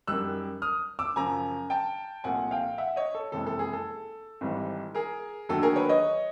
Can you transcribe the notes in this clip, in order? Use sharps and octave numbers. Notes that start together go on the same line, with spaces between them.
F#2 D#3 G3 E6 F#6
D#6 F6
D6 E6
F#2 C#3 F3 G#5 A#5
G5 A5
C2 A#2 F3 A3 F#5 G#5
F5 G5
E5 F#5
C#5 D#5
A4
F#1 F2 C3 E3 G#3 A4
A4
G#4
A4
G#1 G#2 E3 G3
G#4 A#4
D#2 D3 F#3 A3 A4
G#4 A#4
B4 C#5
C#5 D#5